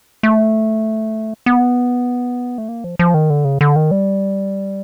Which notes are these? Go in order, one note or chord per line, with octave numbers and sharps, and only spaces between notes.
A3
B3
A3
A#3
F3
F3
D#3
D3
C#3
D3
D#3
G3